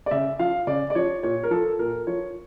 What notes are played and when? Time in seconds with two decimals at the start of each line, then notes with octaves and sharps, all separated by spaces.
0.06 D5
0.11 C#3 E5
0.39 F3 F5
0.67 C#3 D5
0.90 D5
0.95 F3 C#5
1.23 A#2 C#5
1.43 A#4
1.51 F3 A4
1.79 A#2 A#4
2.07 F3 C#5